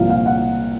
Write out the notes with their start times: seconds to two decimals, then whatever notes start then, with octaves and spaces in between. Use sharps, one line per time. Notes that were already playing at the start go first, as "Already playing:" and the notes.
Already playing: C2 A#2 F3 F5
0.10 F5
0.26 F#5